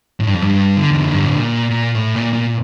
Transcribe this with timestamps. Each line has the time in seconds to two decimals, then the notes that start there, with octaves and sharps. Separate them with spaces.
0.20 A2
0.27 G2
0.34 F2
0.42 G2
0.77 D3
0.91 E2
1.02 F2
1.13 G2
1.25 A2
1.36 A#2
1.95 A2
2.15 A#2
2.33 A#2